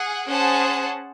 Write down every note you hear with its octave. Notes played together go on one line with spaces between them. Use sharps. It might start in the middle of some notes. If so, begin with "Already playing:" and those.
Already playing: G#4 F#5
C#4 G#4 C5 F#5 A5